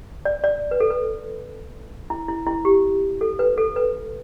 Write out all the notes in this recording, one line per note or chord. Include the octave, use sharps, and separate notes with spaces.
D5
D5
B4
A4
B4
E4
E4
E4
G4
A4
B4
A4
B4